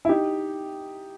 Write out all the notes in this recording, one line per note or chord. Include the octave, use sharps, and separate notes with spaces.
E4
D#4 G4